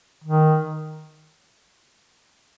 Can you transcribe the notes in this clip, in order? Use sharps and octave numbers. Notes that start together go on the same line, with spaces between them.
D#3